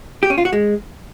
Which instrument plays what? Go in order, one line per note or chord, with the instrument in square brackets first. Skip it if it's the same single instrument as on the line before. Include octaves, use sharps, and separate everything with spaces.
[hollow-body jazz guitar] G4
C#4
F4
F#4
G#3